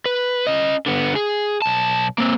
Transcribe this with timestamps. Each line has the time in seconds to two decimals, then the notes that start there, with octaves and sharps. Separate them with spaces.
0.06 B4
0.46 C#4 D#5
0.86 D3 B3
1.15 G#4
1.62 B1 A5
2.18 A#3 C4